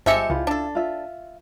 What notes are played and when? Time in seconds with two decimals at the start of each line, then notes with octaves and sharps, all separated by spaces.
0.06 G1 F3 G#3 G4 E5 C#7
0.30 C#2 E4 F4
0.47 D4 A4
0.75 F4 E5